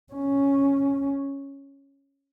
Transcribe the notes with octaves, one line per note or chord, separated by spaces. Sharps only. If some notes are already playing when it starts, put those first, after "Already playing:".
C#4